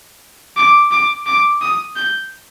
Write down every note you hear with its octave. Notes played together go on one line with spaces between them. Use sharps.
D6
D6
D6
D#6
G6